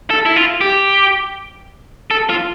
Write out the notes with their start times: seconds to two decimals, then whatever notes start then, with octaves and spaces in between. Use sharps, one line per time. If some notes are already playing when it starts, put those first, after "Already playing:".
0.11 A4
0.26 E4
0.36 F4
0.61 G4
2.11 A4
2.29 F4